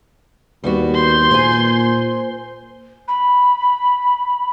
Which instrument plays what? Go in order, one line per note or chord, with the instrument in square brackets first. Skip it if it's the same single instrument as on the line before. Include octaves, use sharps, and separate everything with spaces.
[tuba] D#2 [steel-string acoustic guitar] G3 B3 F#4
[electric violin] C6 G6
[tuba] A#2 [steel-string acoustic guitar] C5 G#5
[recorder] B5